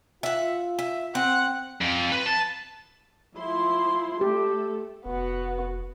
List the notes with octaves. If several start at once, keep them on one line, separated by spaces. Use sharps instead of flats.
F4 E5 F#5
E5
C4 F#5
F2
B4
A5
F3 E4 C6
A3 G4 A4
F1 B3 F#4